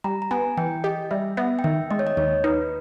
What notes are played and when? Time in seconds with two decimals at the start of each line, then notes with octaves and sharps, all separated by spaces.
0.04 G3 A#5
0.22 A#5
0.31 B3 G#5
0.57 E3 G5
0.84 G4 D#5
1.11 G3 E5
1.37 B3 E5
1.59 G5
1.64 D#3 E5
1.91 G#3 D#5
1.99 C#5
2.07 D#5
2.17 D#2 C#5
2.44 D#4 B4